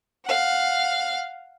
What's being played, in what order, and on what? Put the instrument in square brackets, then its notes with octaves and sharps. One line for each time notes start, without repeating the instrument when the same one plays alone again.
[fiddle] F5 F#5